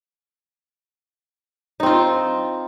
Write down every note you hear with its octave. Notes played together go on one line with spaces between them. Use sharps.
C4 D#4 F4